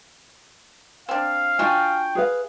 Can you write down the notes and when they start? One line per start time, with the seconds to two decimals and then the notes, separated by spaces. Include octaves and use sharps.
1.09 C4 D4 F5
1.59 D4 F4 F#4 G5 G#5
2.15 G#4 B4 F5